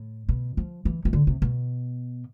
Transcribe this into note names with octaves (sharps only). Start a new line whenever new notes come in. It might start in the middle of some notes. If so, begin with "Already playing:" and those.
Already playing: A2
B2
F3
E3
E3
D3
C3
B2